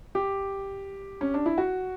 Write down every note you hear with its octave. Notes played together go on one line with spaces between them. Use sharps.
G4
C#4
D4
E4
F#4